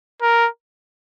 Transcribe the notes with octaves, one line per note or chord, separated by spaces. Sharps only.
A#4